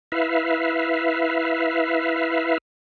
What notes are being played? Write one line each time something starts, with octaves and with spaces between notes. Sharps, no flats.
E4 B4 E5 F5